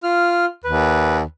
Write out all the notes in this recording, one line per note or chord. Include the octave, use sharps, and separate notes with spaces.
F4 F6
D#2 B4